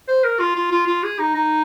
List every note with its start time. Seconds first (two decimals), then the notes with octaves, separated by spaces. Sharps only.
0.08 C5
0.24 A#4
0.40 F4
0.56 F4
0.71 F4
0.87 F4
1.03 G#4
1.19 D#4
1.35 D#4